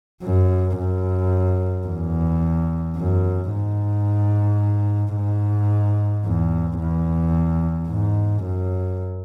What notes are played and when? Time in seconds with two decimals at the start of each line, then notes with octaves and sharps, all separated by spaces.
0.23 F#2
0.78 F#2
1.87 E2
2.97 F#2
3.52 G#2
5.16 G#2
6.26 E2
6.80 E2
7.89 G#2
8.44 F#2